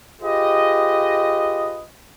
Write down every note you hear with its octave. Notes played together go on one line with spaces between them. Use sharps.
F4 G4 G#4 B4 D#5